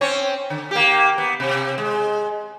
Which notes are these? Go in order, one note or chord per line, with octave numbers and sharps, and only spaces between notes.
C4 C#4 C#5
D3
A#3 G4
B3
C3
G#3